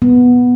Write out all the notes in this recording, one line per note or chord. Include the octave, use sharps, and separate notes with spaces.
B3